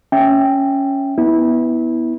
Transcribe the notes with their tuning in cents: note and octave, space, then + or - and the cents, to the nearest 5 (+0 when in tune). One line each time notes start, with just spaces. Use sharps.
C#4 +0 E5 +0 G5 +0
B3 -5 E4 -20